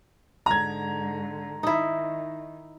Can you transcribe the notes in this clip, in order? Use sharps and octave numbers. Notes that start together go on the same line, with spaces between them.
G#2 D3 A#5 G#6
D#3 D#4 E4